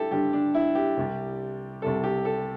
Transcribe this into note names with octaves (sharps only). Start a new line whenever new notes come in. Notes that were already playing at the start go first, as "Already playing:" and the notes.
Already playing: G2 G3 E4 G4 A4
G2 D3 G3 G4
D4
E4
G4
C2 C3 G3
C2 C3 G3 A4
G4
A4